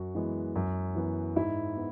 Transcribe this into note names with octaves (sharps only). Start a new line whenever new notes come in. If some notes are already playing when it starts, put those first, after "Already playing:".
Already playing: F#2 F#4
E3 G#3 B3
F#2
E3 B3
G#2 E4
B3